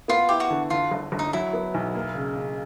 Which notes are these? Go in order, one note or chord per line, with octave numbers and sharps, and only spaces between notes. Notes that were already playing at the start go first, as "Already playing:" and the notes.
B3 F4
E4 G4
F#4
D3
D3 F4
G1
G1
D#4
F#3 E4
B3
B1
A#3
C#3
C#3